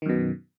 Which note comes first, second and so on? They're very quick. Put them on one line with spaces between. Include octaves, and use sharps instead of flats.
D#3 F#2 B2